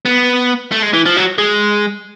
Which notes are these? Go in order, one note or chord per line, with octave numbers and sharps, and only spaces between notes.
B3
A3
G#3
E3
F3
F#3
G#3